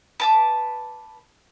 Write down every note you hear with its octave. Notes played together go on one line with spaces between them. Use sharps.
B4 A5 D6